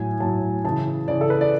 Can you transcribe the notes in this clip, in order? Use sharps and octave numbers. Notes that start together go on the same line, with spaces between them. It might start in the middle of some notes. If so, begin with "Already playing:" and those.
Already playing: A2 F#3 G#5
A2 F#3 A5
C#3 E3 A5
C#3 E3 D5
A4
B4
D5